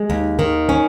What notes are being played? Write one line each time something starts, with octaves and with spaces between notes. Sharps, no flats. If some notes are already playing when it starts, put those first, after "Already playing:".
Already playing: G#3
D#2
D#3
C#4